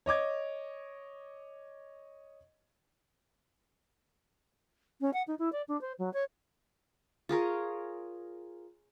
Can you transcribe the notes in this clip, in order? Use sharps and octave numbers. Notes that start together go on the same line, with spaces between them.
C#5 D#5 D6 G#6
C#4
F#5
D#4
E4
D5
D4
C5
F#3
C#5
F4 G#4 A#4 C#5